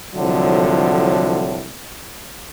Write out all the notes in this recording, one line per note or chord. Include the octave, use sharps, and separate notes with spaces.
C2 A2 D3 F3 F#3